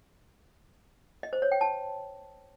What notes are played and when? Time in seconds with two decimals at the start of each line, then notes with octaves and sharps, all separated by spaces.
1.23 D#5
1.33 C5
1.42 C#5
1.52 G5
1.61 A5